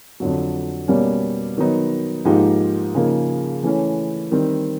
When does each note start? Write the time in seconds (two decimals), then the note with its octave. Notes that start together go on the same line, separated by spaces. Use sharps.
0.20 F2 D3 F#3
0.88 B2 G3 A#3 C#4
1.57 D#3 F#3 B3 D#4
2.25 G#2 F3 A#3 D#4 G4
2.95 C#3 F3 A#3 D#4 G#4
3.63 E3 A3 C#4
4.32 D#3 G3 C4